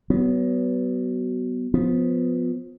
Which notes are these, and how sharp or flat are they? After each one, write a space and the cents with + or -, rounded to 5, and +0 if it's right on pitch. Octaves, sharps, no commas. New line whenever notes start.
F#3 +25 B3 +5
F3 +25 B3 +15